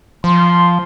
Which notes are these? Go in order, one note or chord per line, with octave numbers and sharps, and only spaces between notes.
F3 C6